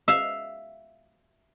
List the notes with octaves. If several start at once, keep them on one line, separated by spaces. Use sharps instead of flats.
E5 F5